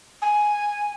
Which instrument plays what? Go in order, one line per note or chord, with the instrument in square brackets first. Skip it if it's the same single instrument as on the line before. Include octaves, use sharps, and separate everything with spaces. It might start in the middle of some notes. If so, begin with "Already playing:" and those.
[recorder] G#5